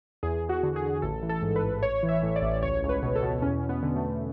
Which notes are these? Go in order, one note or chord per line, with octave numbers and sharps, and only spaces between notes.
E2 G#4
E2
F#4
D3
G#4
D3
A1 A4
E3
A4
G#2
B4
A1
A1 C#5
E3
E5
A2
D5
A1
D5
C#2 C#5
C#2
B4
B2
A4
B2
E2 C#4
E2
B3
D3
A3
D3